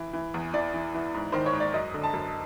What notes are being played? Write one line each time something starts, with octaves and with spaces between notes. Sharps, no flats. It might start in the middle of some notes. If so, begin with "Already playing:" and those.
Already playing: E3
E3
E2
E3 D5
E3
E3
G#2
D#3 C5
C#5
G#2
D5
F#2 D#5
D3
A5
F#2